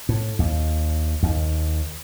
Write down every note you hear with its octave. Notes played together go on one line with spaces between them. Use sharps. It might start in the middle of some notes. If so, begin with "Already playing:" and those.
A2
D#2
D#2